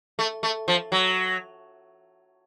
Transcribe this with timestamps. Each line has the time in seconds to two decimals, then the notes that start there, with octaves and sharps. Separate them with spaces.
0.19 A3
0.43 A3
0.68 F3
0.92 F#3